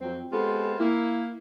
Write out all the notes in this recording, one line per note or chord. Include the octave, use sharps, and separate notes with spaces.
F2 F#3 C4
G#3 B3 C4 F4 G4 A4
A#3 E4